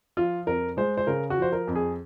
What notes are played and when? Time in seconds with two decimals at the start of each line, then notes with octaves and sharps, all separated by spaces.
0.17 F3 F4
0.47 F2 A#4
0.77 G#3 C5
0.97 C5
1.07 C#3 A#4
1.30 F#4
1.37 F3 C5
1.52 A#4
1.68 F2
1.75 G#4